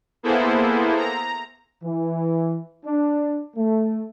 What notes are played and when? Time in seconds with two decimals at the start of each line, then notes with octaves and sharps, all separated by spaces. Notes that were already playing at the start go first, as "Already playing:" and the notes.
0.23 A#3 B3 E4 G#4 A4 C5
0.97 A#5
1.83 E3
2.85 D4
3.56 A3